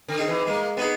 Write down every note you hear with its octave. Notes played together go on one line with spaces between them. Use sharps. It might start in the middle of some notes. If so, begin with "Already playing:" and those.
D3
C4 D#4 G#4
E3
G#3 A#3
B3 C4 D#4 G#4